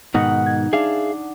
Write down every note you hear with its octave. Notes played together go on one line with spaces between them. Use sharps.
G#2 B2 D#3 D#4 F#5 A#6
G#6
D4 G#4 E5 F5